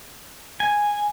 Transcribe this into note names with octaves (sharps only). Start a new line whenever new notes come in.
G#5